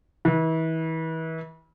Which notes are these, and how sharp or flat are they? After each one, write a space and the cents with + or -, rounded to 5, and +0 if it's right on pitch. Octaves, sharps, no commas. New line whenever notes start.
E3 -35